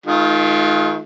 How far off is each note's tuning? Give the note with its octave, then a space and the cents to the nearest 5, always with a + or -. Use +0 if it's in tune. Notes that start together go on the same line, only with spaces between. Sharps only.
D#3 +15 G#3 +45 F4 +0